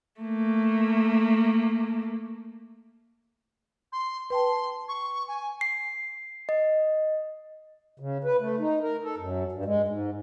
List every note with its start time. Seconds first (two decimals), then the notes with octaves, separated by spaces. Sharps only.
0.21 A3 A#3
3.92 C6
4.30 B4 G5 A5 C6
4.88 C#6
5.28 G#5
5.61 C7
6.49 D#5
8.00 C#3
8.24 B4
8.40 A3
8.59 D#4
8.82 A#4
9.04 A4
9.18 F#2
9.52 G2
9.65 G#3
9.88 G#2